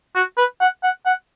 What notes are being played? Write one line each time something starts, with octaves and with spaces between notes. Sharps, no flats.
F#4
B4
F#5
F#5
F#5